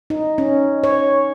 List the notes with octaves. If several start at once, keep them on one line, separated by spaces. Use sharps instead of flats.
D#4
C#4
C#5